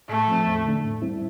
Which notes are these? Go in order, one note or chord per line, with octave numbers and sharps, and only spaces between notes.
A2 A3
F3 C4
E2
D3 A3 D4
A2
G3 C4 E4